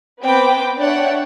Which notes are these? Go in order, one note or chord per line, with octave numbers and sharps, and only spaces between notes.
B3 C4 B4 G5 D6
D4 C#5 D5 E5 F#5 G5